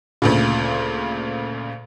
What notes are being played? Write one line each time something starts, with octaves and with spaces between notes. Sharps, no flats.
D2 A#2 C#3